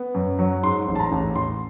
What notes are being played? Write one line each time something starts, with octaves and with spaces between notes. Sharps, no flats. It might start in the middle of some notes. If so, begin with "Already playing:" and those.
Already playing: B3
F#2
F#3
G#2 C6
A1
A5
A#5
A1
A1 C6